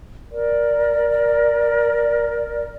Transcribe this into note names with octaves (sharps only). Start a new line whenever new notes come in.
A#4 D5